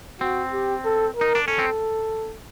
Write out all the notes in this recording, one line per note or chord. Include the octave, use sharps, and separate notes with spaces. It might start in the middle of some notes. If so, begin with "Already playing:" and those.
C4 F#4
G4
A4
D#4 A#4
D4
C#4 A4
C4